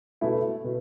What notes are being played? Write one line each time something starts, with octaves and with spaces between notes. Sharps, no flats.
B2 A3 E4
B2